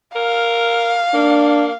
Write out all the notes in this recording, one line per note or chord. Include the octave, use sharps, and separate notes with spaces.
A#4 F5
A#3 D4